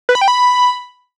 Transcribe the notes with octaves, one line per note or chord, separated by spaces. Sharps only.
B4
B5
G5
B5